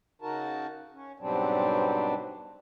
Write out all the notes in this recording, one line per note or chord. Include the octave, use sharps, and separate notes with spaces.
C#3 D#4 F#4 A#4 A5
C#4
G#2 B2 F#3 G3 C4 D4